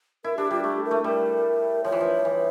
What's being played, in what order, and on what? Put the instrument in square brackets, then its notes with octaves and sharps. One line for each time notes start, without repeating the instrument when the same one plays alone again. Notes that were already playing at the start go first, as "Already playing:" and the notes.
[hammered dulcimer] E4 [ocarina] A#4
[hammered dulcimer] D4 [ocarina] G4
[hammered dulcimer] G3 [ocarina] F4
[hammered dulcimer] A3 [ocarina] G4
[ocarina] A#4
[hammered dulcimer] A3
[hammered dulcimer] G3 [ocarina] A#4
[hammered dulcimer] F3 [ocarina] C#5
[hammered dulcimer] E3
F3
E3